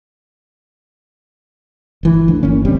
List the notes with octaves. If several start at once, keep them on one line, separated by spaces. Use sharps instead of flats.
G1 E3
D2 F3 D4
G1 A#3 C#4
A1 D2 G3 C4